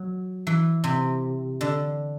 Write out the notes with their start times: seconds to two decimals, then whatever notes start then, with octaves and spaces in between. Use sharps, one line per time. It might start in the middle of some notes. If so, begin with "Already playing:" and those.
Already playing: F#3
0.47 E3
0.84 C3
1.61 D3